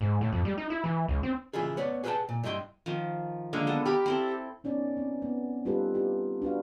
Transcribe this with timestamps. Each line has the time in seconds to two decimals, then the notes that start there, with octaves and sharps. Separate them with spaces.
0.01 G#2
0.21 A2
0.33 F2
0.45 G3
0.58 D#4
0.70 E4
0.84 E3
1.08 C#2
1.23 C4
1.53 C#3 E3 E4 F4 G#4
1.77 B3 C#5 D5
2.04 G#4 B4 C5 F5 G5 A5
2.29 A#2
2.44 G2 E4 D#5 G5 C6
2.86 D#3 F3
3.53 D3 G#3 A#3
3.67 B3 A4
3.85 G4 A#4 B5 D6
4.06 C4 E4 A4
4.64 B3 C#4 D#4 D5
4.97 C4
5.22 B3
5.65 G3 D#4 F4 G4 A4 B4
5.94 E4 F4 G4
6.42 D4 F#4 B4 F5